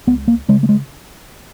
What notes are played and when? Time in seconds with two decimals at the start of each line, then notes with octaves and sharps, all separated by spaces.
0.07 C#2 B3
0.28 A#3
0.48 C#3 G#3
0.63 A3
0.69 G#3